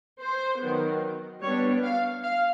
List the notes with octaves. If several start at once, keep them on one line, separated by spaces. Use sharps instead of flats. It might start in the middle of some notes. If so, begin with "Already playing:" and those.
C5
D#3 F#3 B3
G3 B3 D4 C#5
F5
F5